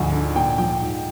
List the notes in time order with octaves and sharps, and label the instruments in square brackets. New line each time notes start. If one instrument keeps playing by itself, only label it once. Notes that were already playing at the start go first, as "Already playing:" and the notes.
Already playing: [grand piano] D2 G#2 F3 G#5
D3
A#2 G5
F3 G5
G#2